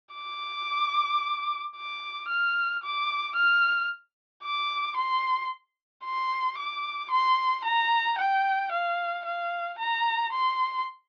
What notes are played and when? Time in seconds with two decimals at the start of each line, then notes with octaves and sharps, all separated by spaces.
0.15 D6
1.77 D6
2.29 F6
2.83 D6
3.36 F6
4.43 D6
4.97 C6
6.05 C6
6.58 D6
7.12 C6
7.65 A#5
8.18 G5
8.72 F5
9.25 F5
9.79 A#5
10.33 C6